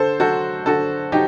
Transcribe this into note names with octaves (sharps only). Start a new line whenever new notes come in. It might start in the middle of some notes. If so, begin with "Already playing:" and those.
Already playing: D3 A4 C5
F#3 F#4 A4
D3 F#4 A4
F#3 D#4 G4